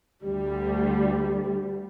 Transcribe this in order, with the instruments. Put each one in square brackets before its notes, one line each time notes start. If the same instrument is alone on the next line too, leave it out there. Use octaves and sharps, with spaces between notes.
[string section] D2 G3